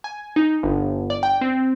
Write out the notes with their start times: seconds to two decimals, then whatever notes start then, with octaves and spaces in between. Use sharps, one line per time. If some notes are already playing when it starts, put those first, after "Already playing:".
0.04 G#5
0.36 D#4
0.63 G1
1.10 D5
1.23 G5
1.41 C4